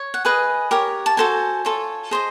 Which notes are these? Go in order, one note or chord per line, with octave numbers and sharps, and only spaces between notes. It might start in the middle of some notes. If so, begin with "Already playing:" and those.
Already playing: C#5
F#5
G#4 B4 D#5 G#5
G4 A#4 C#5
A5
F#4 A4 C5 G#5
F4 A4 C#5
G#4 C5 D#5